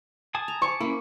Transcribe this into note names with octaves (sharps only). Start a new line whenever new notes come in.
G#5 A5 D#6
A#5
C#6 D6
A#3 C#4 E4